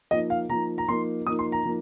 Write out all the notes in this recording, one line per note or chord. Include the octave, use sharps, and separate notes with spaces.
F3 A#3 D#4 D#5
F5
F3 A#3 D#4 A#5
A#5
F3 A#3 D#4 C6
F3 A#3 D#4 D#6
C6
A#5
F3 A#3 D#4